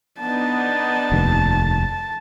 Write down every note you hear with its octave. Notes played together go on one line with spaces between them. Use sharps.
B3 D4 D#4 A5
F1 D#2